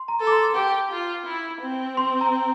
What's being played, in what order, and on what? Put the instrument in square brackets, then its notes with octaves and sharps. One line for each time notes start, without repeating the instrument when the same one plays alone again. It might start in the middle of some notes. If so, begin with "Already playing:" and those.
Already playing: [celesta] C6
A#5
[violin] A4
[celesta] D6
C6
[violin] G4 [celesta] D6
[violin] F4
E4
C4
[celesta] C6
A#5